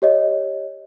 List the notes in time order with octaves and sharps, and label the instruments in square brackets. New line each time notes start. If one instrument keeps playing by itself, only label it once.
[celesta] G4 C#5 D#5